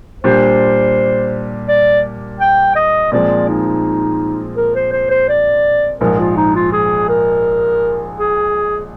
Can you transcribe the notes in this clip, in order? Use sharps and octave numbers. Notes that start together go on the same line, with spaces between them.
A#2 G3 D4 G4 C5
D5
G5
D#5
A#2 F3 G#3 C4 D5
D#4
A#4
C5
C5
C5
D5
A#1 G#2 F3 A#4
F4
D#4
F4
G#4
A#4
G#4